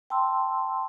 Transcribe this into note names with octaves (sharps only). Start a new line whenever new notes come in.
G5 A5 C6 E6